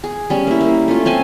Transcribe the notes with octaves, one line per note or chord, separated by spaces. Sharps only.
G#4
G3 C#4
A#3 E4
A#3
A3 C#4 F4
C4 C#4 G#5 A5